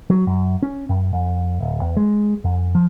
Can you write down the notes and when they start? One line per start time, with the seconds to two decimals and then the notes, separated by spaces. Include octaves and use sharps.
0.10 F#3
0.27 F#2
0.63 C#4
0.89 F#2
1.13 F2
1.60 D1
1.81 E2
1.97 G#3
2.44 F2
2.75 F3